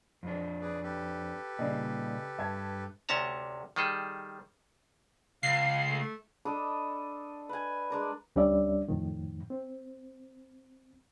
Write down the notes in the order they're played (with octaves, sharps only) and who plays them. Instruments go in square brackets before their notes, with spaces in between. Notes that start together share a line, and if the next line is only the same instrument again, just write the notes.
[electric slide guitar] F2 D4 [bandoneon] E3 G#3
[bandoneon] G#4 B4 D5
G4 A4 B4
[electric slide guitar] A#2 G3 [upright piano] C#3 D5 D#5
[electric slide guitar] G2 [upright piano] E5 A5 G#6
[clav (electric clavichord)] D2 C3 C#4 A5 A#5
D#3 G3 G#4 A4
[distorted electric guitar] C#2 [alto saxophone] F5 [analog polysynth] C7
[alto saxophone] A3
A3
[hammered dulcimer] D4 A4 D#5 B5
B4 G#5
G#3 D4 A#4
[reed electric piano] D2 G3 C#4 D4 D5 E5
F2 A2 D#3
C4